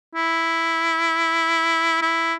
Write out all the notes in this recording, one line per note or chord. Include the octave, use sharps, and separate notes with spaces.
E4
E4